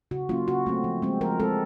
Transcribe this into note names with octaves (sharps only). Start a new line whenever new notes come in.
C#3 F#4
F#3 A#3 C#4 F4
C#3 F#4
F#3 A3 C4
F3
G#3 C4
F3 A#4
G#3 C4 A4